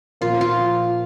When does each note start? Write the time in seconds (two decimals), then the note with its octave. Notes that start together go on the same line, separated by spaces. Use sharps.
0.21 A#2 F3 A#3 F4
0.41 F4